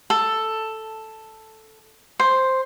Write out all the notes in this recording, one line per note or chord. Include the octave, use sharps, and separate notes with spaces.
A4
C5